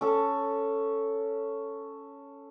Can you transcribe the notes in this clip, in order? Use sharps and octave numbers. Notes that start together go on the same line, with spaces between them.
C#4 A4